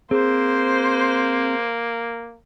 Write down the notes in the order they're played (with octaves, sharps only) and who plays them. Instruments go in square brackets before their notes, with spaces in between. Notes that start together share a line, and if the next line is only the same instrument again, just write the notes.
[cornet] A#3 [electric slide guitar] C4 [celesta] G#4 [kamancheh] C5